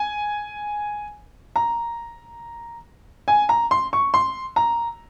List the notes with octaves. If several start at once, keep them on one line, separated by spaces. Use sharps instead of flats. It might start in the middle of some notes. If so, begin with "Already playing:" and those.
Already playing: G#5
A#5
G#5
A#5
C6
C#6
C6
A#5